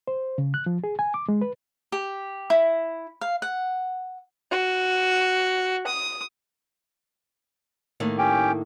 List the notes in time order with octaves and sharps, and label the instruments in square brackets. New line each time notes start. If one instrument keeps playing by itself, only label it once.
[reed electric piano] C5
C#3
F#6
F3
G#4
G#5
D6
G#3
B4
[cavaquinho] G4
E4
F5
F#5
[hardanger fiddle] F#4
D#6
[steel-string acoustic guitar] A2 D#3 A#3
[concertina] C#4 G4 G5